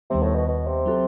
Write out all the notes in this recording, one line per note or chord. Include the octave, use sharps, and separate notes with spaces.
D#2 C3 D#3 G3 B3
A2
B2
B2
C3
F#3 C4 F#4 A4